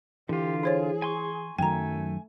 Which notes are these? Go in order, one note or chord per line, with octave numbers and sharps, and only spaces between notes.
D3 E3 F4 G4
E4 G#4 C5 C#5
G#5 C6 C#6
F#2 D#3 F#3 A3 G5 G#5 A#5